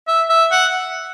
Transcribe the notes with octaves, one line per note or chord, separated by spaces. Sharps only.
E5
E5
F#5